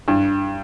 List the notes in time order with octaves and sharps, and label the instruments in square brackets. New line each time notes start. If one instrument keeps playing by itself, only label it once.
[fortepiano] G2